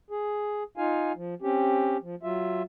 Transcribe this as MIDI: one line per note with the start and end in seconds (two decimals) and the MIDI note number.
0.10 0.63 68
0.77 1.12 63
0.77 1.12 65
0.77 1.12 77
0.77 1.12 80
1.16 1.35 53
1.42 1.97 60
1.42 1.97 61
1.42 1.97 67
2.02 2.15 53
2.23 2.62 54
2.23 2.62 65
2.23 2.62 76